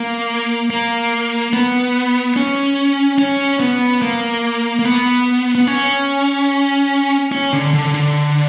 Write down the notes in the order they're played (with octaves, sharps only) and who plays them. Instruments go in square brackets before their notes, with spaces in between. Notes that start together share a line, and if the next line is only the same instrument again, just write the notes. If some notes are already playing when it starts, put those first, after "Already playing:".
Already playing: [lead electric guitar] A#3
A#3
B3
C#4
C#4
B3
A#3
A#3
B3
B3
C#4
C#4
D3
D3
D3